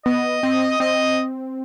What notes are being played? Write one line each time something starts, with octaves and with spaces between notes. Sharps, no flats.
B3 D#5
C4
C4 D#5